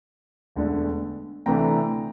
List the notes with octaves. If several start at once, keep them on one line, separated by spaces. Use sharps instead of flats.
E1 D2 D3
D2 C3 E3 A3 D4 G5 A#5